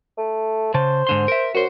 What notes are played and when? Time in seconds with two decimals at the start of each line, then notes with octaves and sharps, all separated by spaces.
0.18 A3
0.74 C#3 C5 A5
1.07 G#2 D3 C6
1.28 A#4 E5
1.55 F#2 F#4 C5